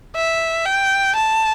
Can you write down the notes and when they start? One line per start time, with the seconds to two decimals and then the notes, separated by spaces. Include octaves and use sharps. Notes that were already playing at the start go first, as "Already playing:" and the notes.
0.16 E5
0.66 G5
1.16 A5